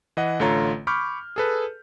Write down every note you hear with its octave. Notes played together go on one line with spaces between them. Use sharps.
E3 D#5 F#5
A1 D3 A3 F4 C#5 A#5
B5 C#6 D6 F6 G6
G#4 A4 B4